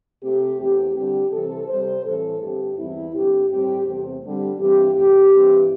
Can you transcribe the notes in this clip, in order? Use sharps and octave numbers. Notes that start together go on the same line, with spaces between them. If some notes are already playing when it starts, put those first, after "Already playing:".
C3 A3 C4 G4
E2 E3 A3 C4 G4
D3 G3 C4 G4
C3 E3 C4 A4
C3 G3 C4 C5
A2 E3 C4 A4
G2 D3 C4 G4
E2 E3 G3 C4 E4
G2 D3 C4 G4
A2 G3 C4 G4
E2 C3 A3 C4
D3 G3 C4
G2 E3 C4 G4
E2 C3 A3 G4
G2 E3 C4